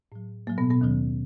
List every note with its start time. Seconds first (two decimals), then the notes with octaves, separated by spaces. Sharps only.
0.12 A2 F#3
0.47 A2 F#3 A#3
0.58 B2 B3
0.70 B2 B3
0.81 D#2 D#3 F#3